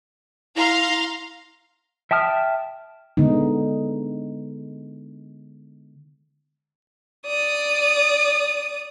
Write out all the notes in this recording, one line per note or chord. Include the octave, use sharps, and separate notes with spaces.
E4 F5 A#5 C6
E5 G5 A5 D#6 F6
D3 G#3 B3 D#4
D5 D#6